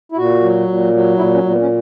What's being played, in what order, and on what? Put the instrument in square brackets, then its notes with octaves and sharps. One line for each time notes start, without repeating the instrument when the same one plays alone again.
[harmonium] E4
A#2 F#4
F#3
A#2
F#3
A#2 E4
C#4
A#2
B3
C#4